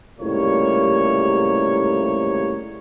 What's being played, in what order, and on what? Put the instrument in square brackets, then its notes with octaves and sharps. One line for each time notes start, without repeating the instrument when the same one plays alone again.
[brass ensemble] C#2 A2 C3 G3 A#3 C#5